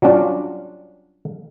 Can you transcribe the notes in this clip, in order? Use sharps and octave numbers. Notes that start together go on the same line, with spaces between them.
F#3 G3 C#4 D4 F4